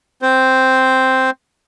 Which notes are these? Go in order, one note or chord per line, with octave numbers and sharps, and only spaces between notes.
C4 C5